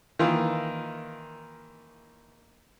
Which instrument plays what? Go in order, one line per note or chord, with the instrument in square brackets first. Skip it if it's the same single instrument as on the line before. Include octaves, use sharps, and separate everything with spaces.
[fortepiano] D#3 E3 A#3 F4